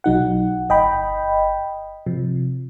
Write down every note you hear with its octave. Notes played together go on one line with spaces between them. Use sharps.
B1 F#3 D#4 F#5
G1 D#5 G5 B5
C3 F3